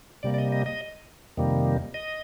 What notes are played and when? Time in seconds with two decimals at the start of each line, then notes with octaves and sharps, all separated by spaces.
0.23 C3 G3 A#3 D5
0.34 D5
0.38 D#5
0.52 D#5
0.66 D#5
1.37 F2 C3 D#3 G3 A#3
1.94 D#5